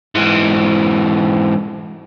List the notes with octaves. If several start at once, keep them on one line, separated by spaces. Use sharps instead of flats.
G#2 E3